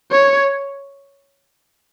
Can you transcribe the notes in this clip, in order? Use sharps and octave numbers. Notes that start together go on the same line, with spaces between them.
C#5